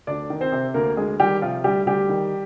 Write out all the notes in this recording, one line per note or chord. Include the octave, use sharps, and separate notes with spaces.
D2 D4 D5
D#3
C4 C5
C3
D2 A#3 A#4
D2 G#3 G#4
D#3 G3 G4
C3 F3 F4
D2 G3 G4
D2 G3 G4
D#3